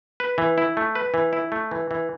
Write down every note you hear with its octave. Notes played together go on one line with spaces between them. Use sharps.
B4
E3
E4
A3
B4
E3
E4
A3
E3
E3